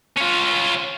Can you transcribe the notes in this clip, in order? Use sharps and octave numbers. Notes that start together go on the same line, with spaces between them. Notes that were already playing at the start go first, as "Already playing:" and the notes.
C#4 F4